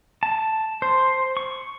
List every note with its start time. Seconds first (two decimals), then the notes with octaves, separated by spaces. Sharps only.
0.23 A5
0.82 C5
1.37 C#6